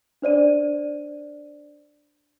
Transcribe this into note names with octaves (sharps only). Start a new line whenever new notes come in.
D4 C5 D5 D#7